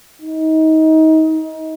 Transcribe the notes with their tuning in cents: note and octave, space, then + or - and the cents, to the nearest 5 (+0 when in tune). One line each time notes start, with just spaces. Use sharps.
D#4 +25